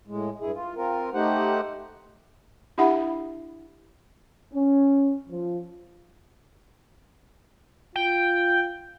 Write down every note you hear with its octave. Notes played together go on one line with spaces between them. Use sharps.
A2 G#3
G2 E4 G#4
F4
C4 F4 A#4
A3 D#4 G4 C5 F#5
D4 E4 G4 E5 F#5 B5
C#4
F3
F4 G5